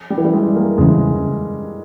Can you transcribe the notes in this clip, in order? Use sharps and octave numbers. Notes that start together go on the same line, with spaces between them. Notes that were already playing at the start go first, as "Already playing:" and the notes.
G3
E3
G3
G#3
A#3
E2 C#3 E3 G#3